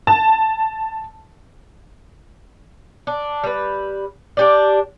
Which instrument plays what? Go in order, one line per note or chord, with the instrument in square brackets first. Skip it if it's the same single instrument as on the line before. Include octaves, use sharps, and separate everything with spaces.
[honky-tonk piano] A5
[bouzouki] D4
G3 B4
D4 G4 D5